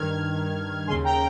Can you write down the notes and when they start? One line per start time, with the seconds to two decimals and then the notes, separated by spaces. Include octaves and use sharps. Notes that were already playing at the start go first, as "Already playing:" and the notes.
Already playing: G2 D#3 F6 G#6
0.87 D#2 C#3 G#5 C6
1.04 G5 A#5